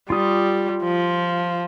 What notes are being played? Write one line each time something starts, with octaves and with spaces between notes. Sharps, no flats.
G3 F4 D#6
F3